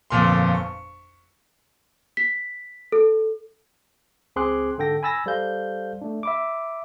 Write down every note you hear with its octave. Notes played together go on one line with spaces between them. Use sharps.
G1 F2 A#2 C6
C#6
B6
A4
C#2 C4 G#4 C6 D6 F#6
G#2 D3 A4 G5 A#6
G#5 B5 E6 A6 A#6
G3 A4 C5 F5 G6
A3 D4
E5 B5 D6